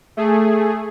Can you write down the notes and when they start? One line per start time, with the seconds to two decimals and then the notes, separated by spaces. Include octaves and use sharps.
0.17 A3 G#4